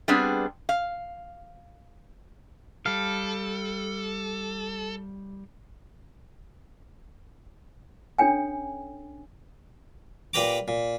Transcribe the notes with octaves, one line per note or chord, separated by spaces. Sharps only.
G3 B3 C4 D4 G#4
F5
G3 A4 F5
C#4 D4 A4 C#5 G5 G#5
A#2 G4 B4 G5 A#5 D6
A#2